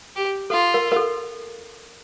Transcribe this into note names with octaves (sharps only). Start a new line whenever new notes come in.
G4
F4 A4
A#4
A#4
A4